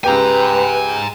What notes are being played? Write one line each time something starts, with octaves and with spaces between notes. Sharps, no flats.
C#2 G4 B4 G5 G#5 A#5